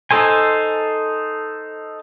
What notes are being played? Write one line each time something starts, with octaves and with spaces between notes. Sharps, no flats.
D#4 A4 C5 G#5